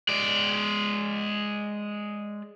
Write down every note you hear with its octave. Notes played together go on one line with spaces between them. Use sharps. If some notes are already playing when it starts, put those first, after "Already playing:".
G#3 D5